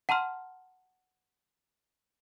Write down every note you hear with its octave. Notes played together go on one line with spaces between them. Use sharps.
F#5 A5 A#5 C6 F6